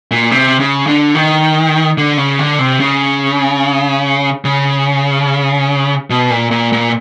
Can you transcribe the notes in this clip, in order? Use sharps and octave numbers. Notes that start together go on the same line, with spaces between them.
A#2
C3
C#3
D3
D#3
D3
C#3
D3
C3
C#3
C#3
B2
A#2
A#2
A#2